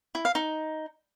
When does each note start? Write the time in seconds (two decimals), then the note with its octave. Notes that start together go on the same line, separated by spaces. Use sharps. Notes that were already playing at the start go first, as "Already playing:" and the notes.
0.15 E4
0.25 F5
0.35 D#4